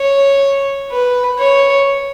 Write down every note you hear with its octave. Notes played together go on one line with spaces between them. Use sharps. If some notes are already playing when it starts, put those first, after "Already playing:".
Already playing: C#5
B4
C#5